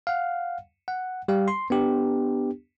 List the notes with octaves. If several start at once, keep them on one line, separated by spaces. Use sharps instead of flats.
F5 F#5
F#5
G3 G4 F5
C6
B3 D4 G4